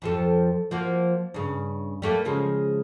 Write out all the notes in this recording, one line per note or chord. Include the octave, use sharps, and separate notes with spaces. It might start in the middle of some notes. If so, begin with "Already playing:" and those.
F2 F3 A4
F3 A#3 F#4
G2 C#3
G3 A3 A#3
C#3 F3 G#3